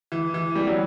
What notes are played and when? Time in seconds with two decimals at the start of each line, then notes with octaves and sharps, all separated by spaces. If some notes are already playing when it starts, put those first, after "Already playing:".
0.12 E3
0.34 E3
0.55 G3
0.67 F#3